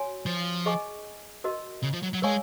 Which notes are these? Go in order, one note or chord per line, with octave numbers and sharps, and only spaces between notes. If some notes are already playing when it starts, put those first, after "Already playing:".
Already playing: F#4 C#5 G#5
F3
G#4 D#5 G#5 C#6
F#4 A#4 D#5
C#3
F3
F#3
F#3
G#3 A#4 C#5 F5 G#5 C#6